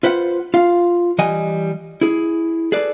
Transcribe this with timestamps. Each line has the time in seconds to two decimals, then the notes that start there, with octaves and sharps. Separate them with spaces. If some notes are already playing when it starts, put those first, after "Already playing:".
0.03 F4 B4 C5 F5 F#5
0.54 F4 F5
1.18 E3 G3 D#5 F#5 G#5
2.01 E4 G#4
2.72 G#4 A4 B4 D5